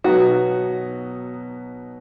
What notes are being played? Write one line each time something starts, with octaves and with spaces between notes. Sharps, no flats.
B2 F#3 B3 D#4 F#4